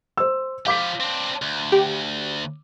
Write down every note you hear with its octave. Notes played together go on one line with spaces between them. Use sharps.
C5 E6
F3 G4 F5 D6 B6
C4 D4
D2
G4